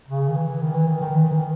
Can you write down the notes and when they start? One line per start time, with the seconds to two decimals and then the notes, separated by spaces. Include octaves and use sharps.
0.08 C#3
0.29 D#3
0.35 E3
0.61 D#3
0.75 E3
0.88 D#3
1.01 D#3
1.14 E3
1.31 D#3